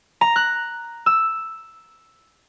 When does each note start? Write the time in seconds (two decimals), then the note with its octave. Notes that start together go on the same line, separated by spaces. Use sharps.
0.21 A#5
0.36 F#6
1.06 E6